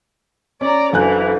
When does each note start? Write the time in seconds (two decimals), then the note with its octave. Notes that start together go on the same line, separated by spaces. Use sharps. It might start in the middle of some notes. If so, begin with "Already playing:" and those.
0.61 C#4 D5 A#5
0.93 F#1 D3 E3 G#5 F#6